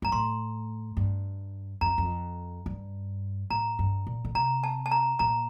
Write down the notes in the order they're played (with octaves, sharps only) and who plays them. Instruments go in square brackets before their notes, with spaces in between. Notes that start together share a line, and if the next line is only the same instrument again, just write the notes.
[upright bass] G2 [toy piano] A#5
[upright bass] A2 [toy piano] C6
[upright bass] G2
[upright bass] F2 [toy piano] A#5
[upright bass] F2
G2
[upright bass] A2 [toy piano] A#5
[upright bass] G2
A#2
D3
[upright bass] C3 [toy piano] A#5
[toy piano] A5
A5
A#5
[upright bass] A#2 [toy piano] A#5